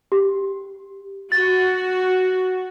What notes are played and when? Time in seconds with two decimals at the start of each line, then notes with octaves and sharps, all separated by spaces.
0.12 G4
1.32 F#4 A6